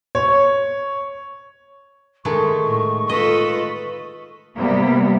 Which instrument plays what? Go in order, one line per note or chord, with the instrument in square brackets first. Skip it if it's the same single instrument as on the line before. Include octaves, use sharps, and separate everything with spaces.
[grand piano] C#5
[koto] D#3 G#3 A3 [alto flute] C#6
[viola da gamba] A2
[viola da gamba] F4 A4 B4 [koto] D#5
[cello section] C3 G3 A#3 B3